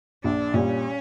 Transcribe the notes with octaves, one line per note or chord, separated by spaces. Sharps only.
A#1 D4
A#2 G3 C#4